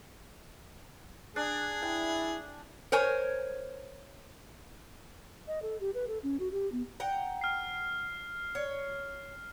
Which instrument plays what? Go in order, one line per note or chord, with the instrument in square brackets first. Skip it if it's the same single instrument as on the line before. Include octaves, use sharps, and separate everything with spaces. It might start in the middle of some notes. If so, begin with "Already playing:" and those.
[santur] D4 [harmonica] G#4
[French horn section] E4 [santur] G5
[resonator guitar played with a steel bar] A#4 C5 C#5 G#5
[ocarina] D#5
A4
G4
B4
A4
C#4
F#4
G4
B3
[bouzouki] F#5 G5 A#5
[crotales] F6 C7
[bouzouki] C#5